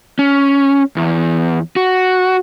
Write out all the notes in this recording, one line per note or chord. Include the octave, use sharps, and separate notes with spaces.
C#4
E2
F#4